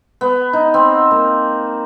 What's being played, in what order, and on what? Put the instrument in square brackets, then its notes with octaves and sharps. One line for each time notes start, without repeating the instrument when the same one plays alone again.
[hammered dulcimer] B3
D#4
C4
A#3